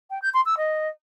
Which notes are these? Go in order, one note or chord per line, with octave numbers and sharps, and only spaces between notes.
G5
G6
C6
E6
D#5